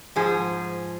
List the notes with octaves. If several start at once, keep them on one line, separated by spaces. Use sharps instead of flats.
G#2 F3 G#4